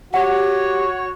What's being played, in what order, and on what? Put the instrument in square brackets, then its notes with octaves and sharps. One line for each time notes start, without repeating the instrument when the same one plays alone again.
[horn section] F#4 C#5 [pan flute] G4 [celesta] F#5